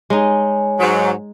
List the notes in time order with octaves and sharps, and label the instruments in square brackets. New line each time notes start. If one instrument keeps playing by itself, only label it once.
[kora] G#3 D#4 [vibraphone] C#5 G#5
[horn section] G#2 F#3